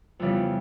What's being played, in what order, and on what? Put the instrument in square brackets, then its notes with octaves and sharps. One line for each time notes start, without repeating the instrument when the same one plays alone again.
[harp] F2 C#3 E3 G3 B3